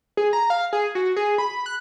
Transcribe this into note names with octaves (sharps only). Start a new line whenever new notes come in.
G#4
A#5
F5
G#4
F#4
G#4
B5
F#6